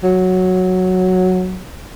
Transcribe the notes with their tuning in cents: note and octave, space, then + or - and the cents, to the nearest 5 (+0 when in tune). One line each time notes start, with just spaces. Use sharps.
F#3 -5